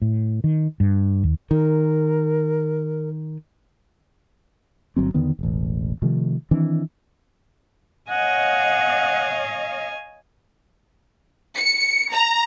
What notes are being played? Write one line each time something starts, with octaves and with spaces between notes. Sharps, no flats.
A2
D#3
G2
D#2
D#3 A#4
G1 F#3 C4
E2 D3 D#3 B3
E1 A1
C3 D#3 F3 A3
D#3 E3 C4 D4
C#5 D#5 F5 F#5 G#5
C#7
A#5